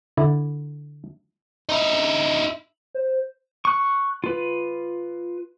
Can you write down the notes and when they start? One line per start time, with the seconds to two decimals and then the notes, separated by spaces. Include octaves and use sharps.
0.17 D3 E4 D5
1.69 D#4 E4
2.95 C5
3.65 C#6 F#6
4.24 F4 B4